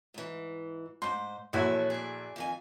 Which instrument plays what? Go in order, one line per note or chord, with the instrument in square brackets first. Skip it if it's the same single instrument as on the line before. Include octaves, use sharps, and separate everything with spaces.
[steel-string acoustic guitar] G#2 E3
[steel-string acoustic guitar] G#2 C5 [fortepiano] C6
[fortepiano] A#1 E4 F#4 [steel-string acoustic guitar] E2 A4 C#5
[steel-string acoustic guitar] G#4 D5
F2 D#3 G#5